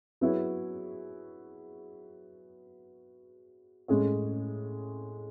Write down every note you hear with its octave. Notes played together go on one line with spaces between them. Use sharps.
F#3 B3 E4 G#4 C#5
A2 G#3 C#4 G#4 C#5